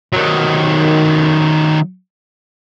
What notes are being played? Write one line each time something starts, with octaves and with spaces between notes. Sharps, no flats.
D#3 F#3